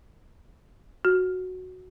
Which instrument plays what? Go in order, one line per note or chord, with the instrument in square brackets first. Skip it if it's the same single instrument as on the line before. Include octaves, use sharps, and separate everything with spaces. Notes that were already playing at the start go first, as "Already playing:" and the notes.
[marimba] F#4